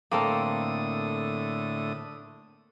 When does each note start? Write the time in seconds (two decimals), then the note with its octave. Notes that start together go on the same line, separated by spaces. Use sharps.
0.12 A2 D3 A#3 C4 A4 D#6